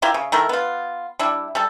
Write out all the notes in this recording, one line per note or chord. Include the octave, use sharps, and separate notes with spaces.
E4 F4 G4 A#4
C#3
D#3 A3 E4 A#4
B3 F4
G3 D4 E4
G3 A4